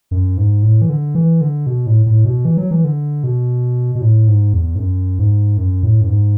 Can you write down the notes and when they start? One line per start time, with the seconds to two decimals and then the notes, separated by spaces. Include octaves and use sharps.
0.11 F#2
0.37 G#2
0.63 A2
0.82 E3
0.89 D3
1.15 E3
1.41 D3
1.67 B2
1.87 A2
2.06 A2
2.25 B2
2.45 E3
2.57 F#3
2.71 E3
2.84 D3
3.24 B2
3.95 B2
4.01 A2
4.28 G#2
4.53 E2
4.75 G#2
4.79 F#2
5.19 G#2
5.57 F#2
5.83 A2
6.01 F#2
6.09 G#2